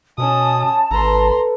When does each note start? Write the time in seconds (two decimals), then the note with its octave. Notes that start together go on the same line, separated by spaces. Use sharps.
0.18 B2 C#4 A5 D#6
0.91 G#1 A4 B4 A#5 C6